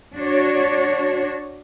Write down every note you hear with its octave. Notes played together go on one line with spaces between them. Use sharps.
D4 F#4 C#5